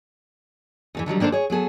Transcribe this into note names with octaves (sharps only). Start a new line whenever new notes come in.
E2 D3 E3
D3 D#3 F#3 G3
D#3 A#3 D4 A4 C5
G#4 C#5
F#3 B3 G#4 A4